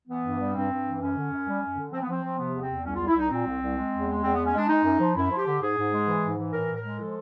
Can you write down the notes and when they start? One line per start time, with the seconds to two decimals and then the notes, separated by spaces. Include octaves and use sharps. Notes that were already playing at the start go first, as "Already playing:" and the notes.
0.08 E3 B3
0.23 G2
0.39 G3
0.54 G2 C4
0.70 G2
0.85 E3
1.00 F#2 C#4
1.16 D3
1.31 F#2
1.47 G3
1.62 F#2
1.77 D3
1.92 F3 C4
2.01 B3
2.08 F3 C4
2.23 F3
2.38 C3 B3
2.54 E2
2.62 C4
2.69 E2
2.85 C2 C#4
2.96 C2 F4
3.08 E4
3.15 C2 D#4
3.30 A#2 C4
3.46 C2
3.61 C2
3.76 G#3
3.93 E2
4.08 G#3
4.23 E2 C4
4.35 G#3 B3
4.46 C#4
4.54 G#3 D4
4.69 G#3 D#4
4.84 F#2
5.00 F3
5.15 F#2 E4
5.31 F3
5.38 G4
5.46 D3
5.61 G#2 G#4
5.76 G#2
5.92 G#3
6.07 E3
6.22 G#2
6.38 E3
6.53 A2 A#4
6.69 A2
6.77 A#4
6.84 G#3
6.99 F3 A4